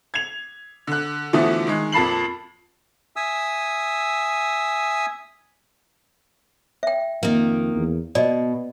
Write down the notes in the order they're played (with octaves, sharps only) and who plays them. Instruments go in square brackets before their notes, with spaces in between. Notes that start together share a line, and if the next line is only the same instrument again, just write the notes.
[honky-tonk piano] G#6 F7
D3 F#6
B2 D3 E3 F3 A3 B3
D#3 G#3
F2 A#2 A5 B5 C7 F#7
[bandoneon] E5 G#5 D#6 E6
[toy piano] E5 G5
[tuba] F2 [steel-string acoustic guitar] D#3 A#3
[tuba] E2
[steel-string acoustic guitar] B2 [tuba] B3 [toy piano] D5 D#5